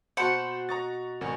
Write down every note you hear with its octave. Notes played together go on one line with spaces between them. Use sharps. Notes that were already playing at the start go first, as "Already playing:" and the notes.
B2 F#4 C5 F#5 A5 B5 G6
D#5 A#5 C#6 A6
G#1 B2 C#4 F#4 A#4